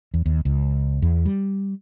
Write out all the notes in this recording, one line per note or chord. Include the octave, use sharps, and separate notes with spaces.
E2
D#2
C#2
E2
G3